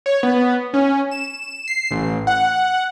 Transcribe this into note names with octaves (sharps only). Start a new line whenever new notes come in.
C#5
B3
C#4
E7
C7
A1
F#5